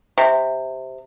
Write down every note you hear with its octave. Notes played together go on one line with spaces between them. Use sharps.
C3